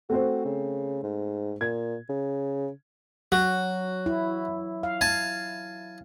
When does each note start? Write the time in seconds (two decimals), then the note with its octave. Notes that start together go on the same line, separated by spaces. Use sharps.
0.10 A3 C4 F#4 C5
0.45 C#3
1.03 G#2
1.61 A#2 G#6
2.09 C#3
3.32 F#3 F#4
4.06 E4
4.83 F5
5.01 G#5 A5